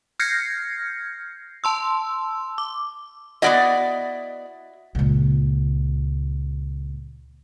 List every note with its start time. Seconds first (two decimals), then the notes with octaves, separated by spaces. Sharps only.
0.20 F6 G6 G#6 A#6 C7 C#7
1.64 A5 C6 E6
2.58 D6
3.42 B3 E4 F#4 D5 D#5
4.95 C#2 A#2